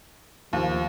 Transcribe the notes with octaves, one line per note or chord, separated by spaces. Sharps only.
D#2 F3